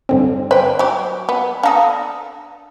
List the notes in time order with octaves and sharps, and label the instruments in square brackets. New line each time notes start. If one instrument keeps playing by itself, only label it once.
[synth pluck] G2 D3 C4
[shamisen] B4 G5 [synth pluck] C5
[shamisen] F#3 G4
B3
[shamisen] D4 A4 [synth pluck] F5 A#5 D#6